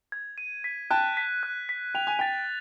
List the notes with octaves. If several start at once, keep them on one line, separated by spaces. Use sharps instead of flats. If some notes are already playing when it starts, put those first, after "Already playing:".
G#6
D#7
B6
G5 A5 F#6
B6
F#6
B6
G5 F7
G#5
G5 A6